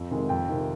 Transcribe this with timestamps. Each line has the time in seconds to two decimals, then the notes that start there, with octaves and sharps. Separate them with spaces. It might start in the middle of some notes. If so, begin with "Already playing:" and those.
Already playing: F2
0.10 C3 D#3 G#3
0.29 F2 G5
0.48 C3 D#3